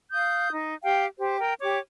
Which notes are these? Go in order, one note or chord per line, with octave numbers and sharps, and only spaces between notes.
F5 D#6 G6
D#4
G4 F5 G5
G4 C5
A#4 G5
G4 C#5 D6